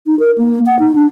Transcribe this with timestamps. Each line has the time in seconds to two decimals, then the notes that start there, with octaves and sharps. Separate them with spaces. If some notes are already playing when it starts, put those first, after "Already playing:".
0.07 D#4
0.20 A#4
0.38 A#3
0.66 F#5
0.79 D#4
0.95 D4